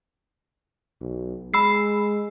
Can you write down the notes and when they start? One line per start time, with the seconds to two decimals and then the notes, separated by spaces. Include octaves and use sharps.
1.01 B1
1.54 G#3 B5 E6 C7